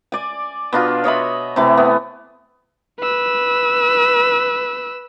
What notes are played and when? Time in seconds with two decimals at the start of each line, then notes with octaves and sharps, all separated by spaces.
0.12 D5 G#5
0.73 B2 D4 F4
1.04 C#5 D#5 E5 B5
1.56 C3 E3 A3
1.77 B3
3.00 B4 E6